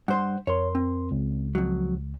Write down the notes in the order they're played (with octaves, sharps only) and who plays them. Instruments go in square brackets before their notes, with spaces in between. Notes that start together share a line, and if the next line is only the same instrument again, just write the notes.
[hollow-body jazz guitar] G2 C5 C6 [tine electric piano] F#5
[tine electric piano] F2 A#4 C6 [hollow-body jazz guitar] C#5
[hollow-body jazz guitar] C4
[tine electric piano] C#2
[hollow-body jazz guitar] F2 F#3